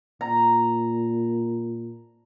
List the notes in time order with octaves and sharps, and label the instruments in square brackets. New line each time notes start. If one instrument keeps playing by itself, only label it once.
[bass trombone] A#2 [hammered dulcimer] A#5